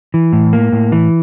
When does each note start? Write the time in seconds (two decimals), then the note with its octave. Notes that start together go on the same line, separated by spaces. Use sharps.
0.14 E3
0.33 A2
0.53 A#3
0.72 A2
0.92 E3